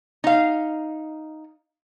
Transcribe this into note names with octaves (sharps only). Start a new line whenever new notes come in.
D#4 F5